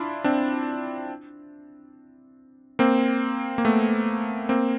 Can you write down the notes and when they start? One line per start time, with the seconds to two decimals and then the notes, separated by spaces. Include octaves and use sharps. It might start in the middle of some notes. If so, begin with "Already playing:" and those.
Already playing: D4 E4 F4
0.24 C4 D4
2.79 A#3 C4
3.58 A#3
3.64 A3 B3
4.49 A#3 C4